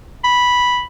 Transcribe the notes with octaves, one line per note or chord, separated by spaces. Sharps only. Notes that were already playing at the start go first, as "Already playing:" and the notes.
B5